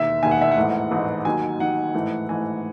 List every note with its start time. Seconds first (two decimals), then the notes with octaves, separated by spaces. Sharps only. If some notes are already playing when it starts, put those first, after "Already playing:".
Already playing: E1 D#2 D#3 E5
0.22 E1 D#2 D#3 G#5
0.31 F#5
0.41 E5
0.51 F#5
0.57 A1 G#2 E3 A3
0.91 A1 G#2 E3 A3
1.25 D#2 D#3 F#3 G#5
1.60 D#2 D#3 F#3 F#5
1.94 A1 G#2 E3 A3
2.28 A1 G#2 E3 A3 G#5